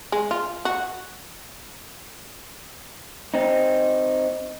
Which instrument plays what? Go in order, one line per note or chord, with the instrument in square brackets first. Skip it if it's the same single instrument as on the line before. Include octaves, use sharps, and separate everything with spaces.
[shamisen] G#3
F4
F#4
[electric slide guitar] C4 D#4